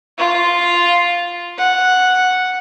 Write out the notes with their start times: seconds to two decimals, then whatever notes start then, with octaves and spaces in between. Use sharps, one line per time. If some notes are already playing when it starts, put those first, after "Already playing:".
0.18 F4
1.59 F#5